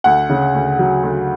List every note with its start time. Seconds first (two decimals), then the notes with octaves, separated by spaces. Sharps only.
0.04 D2 F#5
0.30 C#3
0.55 D2
0.79 F#3
1.03 D2